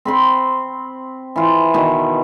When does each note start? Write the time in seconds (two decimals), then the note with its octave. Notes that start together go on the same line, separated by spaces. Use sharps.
0.05 C4 B5 C6
1.36 E3 F4
1.74 B2 D#3